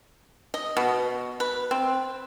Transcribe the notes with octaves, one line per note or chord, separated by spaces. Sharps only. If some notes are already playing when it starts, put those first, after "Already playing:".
D#5
B2
B4
C4